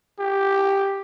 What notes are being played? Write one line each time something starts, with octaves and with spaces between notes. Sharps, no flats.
G4